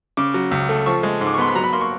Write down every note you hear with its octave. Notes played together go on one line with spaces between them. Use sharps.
C#3 D6
F#3
C#2
A3
F3 C#6
G#3
G#2
D6
C#6
B3 C6
B5
F#3 A#5
B5
A#3 C6
C#6